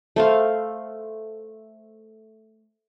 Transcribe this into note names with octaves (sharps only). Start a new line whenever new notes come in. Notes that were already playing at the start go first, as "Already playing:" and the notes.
A3 C5 F5